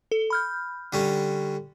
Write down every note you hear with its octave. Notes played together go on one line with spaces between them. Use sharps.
A4
B5 F6 G6
D3 G3 C#4